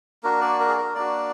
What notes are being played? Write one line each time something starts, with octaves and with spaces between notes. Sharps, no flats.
A#3 D4 F#4 A#4
D5
A#4
G#4
A#4
A#3 D4 F#4 D5